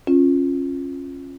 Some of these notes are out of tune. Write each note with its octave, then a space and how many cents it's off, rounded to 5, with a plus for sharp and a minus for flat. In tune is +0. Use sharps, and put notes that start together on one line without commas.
C#4 -20 F4 +0